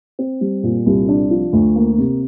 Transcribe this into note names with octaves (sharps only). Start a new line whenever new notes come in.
C4
G3
A#2
C2
D4
F3
D2
A#3
C3